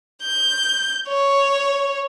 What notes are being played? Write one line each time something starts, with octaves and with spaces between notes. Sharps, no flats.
G6
C#5